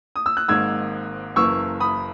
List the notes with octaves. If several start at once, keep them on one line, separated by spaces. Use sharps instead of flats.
D#6
E6
F#6
G#1 G#2 D#3 A#3 E6 G#6
F#1 F#2 E3 A#3 C#6 E6
B5 D#6